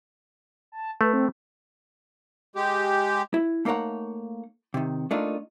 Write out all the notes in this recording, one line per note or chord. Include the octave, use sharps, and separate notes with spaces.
A5
A3 B4
C4
G#3 G4
E4
A3 A#3 D#4 A#4 C#5 F#5
C3 D#3
A3 A#3 D4 D#4 F4